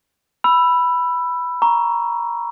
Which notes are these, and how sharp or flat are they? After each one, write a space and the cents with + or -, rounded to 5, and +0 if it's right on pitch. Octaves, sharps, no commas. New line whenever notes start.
B5 +0 E6 +15
A#5 +10 C#6 +0